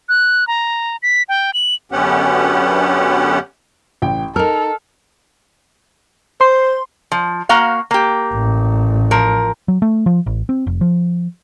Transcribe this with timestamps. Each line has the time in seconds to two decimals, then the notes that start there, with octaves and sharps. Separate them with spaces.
0.09 F#6
0.48 A#5
1.02 B6
1.29 G5
1.54 F#7
1.92 F#2 D3 B3 C#4 G4 F#5
4.02 A1 G5
4.36 D#4 A4 A#4 F6 F7
6.41 C5 C6
7.12 F3
7.49 A#3 F#4 F5
7.91 A#3 G4
8.33 A1
9.11 F3 A#4
9.68 F#3
9.82 A3
10.06 F3
10.26 A1
10.49 C4
10.67 F1
10.81 F3